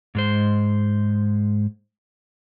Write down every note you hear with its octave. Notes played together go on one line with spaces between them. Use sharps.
G#2 G#3 C5